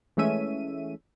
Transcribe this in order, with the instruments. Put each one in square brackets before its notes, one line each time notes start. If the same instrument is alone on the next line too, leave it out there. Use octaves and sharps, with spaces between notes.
[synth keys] E3 G#3 A3 C#4 E5 D#7